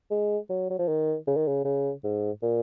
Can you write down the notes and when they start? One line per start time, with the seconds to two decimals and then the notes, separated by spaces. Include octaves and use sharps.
0.11 G#3
0.49 F#3
0.70 F#3
0.79 F3
0.88 D#3
1.27 C#3
1.36 D#3
1.48 C#3
1.65 C#3
2.04 G#2
2.42 A#2